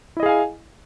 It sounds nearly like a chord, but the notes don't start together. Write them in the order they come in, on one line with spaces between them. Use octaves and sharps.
E4 D#5 G#4 F5 G#5